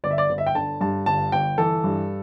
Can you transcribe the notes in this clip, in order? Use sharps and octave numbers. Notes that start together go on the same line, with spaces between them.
G1 D5
E5
D5
G1
E5
G5
D3 A5
G2 A5
G1 A5
G1 G5
E3 A4
G2